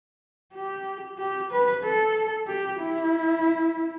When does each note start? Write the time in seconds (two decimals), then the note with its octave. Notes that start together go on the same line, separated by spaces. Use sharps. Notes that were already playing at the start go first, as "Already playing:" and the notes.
0.54 G4
1.18 G4
1.51 B4
1.83 A4
2.47 G4
2.80 E4